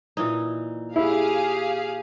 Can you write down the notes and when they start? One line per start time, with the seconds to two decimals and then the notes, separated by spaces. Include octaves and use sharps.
0.17 A#2 E3 D#4
0.96 E4 G4 G#4 F5